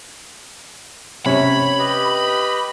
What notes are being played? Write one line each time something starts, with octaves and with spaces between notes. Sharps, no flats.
C3 C#4 C#5 B5
G4 B4 D#5